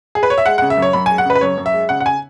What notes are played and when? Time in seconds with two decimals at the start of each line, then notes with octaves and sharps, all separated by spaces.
0.15 G#4
0.23 B4
0.30 C#5
0.38 E5
0.46 G#3 F#5
0.58 F#5
0.62 C#3
0.70 E5
0.77 F#2 C#5
0.93 F#2 B5
1.06 G#5
1.10 G#3
1.18 F#5
1.25 C#3 B4
1.35 B4
1.41 F#2 C#5
1.58 F#2
1.66 E5
1.73 G#3
1.89 C#3 F#5
2.00 F#5
2.06 G#5